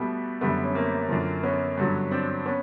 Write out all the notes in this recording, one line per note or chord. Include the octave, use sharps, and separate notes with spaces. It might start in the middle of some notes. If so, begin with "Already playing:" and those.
Already playing: B2 G3 A3 B3
F#2 D3 G3 A3 B3
C#4
A#3 C4
F#2 D3 F3
B3 C#4
G2 D3 F#3
C4 D4
B3 C#4